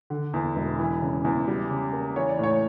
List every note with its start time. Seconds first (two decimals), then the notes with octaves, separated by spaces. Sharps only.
0.10 D3
0.34 E2
0.56 E1
0.79 E3
1.02 C#3
1.25 E2
1.48 G3
1.70 C#3
1.93 A#3
2.16 E3 C#5
2.29 D5
2.39 A2 C#5